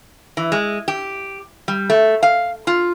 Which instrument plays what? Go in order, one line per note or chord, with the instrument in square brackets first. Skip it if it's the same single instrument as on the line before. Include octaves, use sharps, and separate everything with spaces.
[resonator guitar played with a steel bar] E3
G#3
G4
G3
A3
F5
F4